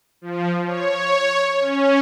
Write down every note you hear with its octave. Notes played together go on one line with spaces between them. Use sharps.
F3
C#5
C#4